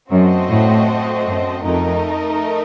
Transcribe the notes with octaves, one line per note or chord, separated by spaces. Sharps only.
F#2 A3 C4 F#4 C5 D#5
A2
F#2
F2 A3 D#4 A#4 D#5